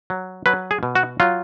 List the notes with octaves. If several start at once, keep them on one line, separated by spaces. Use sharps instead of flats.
F#3
F#3 B4
G#4
B2
F#4
F#3 F4